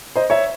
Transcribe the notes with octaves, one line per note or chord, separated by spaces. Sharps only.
C5 D#5
C#5 E5